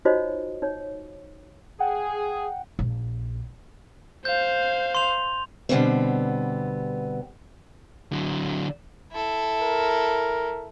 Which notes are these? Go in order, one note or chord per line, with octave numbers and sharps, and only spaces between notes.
D#4 F4 F#4 C5 C#5 D#5
D#4 C#5
G#4 F#5 G5
A#1
C5 F5 G6
C6 F7
B2 D3 G3 B3 C4
D3 F#3
E4 A4
A#4